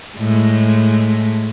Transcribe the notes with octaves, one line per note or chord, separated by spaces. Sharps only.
A2 G#3